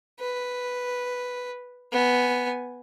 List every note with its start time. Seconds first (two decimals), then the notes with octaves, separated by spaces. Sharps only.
0.20 B4
1.92 B3 G#5